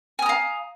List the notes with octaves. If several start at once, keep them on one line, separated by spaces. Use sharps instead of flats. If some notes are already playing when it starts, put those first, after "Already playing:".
F5 G#5 A#5 D#6